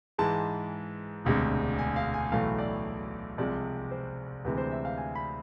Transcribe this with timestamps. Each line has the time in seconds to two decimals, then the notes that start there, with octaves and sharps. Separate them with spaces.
0.18 G#2 E3 G#3 A5
1.25 E1 D2 C3 G#3
1.79 G#5
1.96 F5
2.14 G#5
2.32 B1 A2 E3 A3 F5
2.58 D5
3.38 C2 C3 F3 G#3 D5
3.91 C5
4.45 D2 C3 E3 G#3 B4
4.58 C5
4.71 E5
4.85 F5
4.97 G#5
5.15 B5